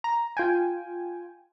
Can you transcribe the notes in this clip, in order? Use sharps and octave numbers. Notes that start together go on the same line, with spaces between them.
A#5
F4 G5 G#5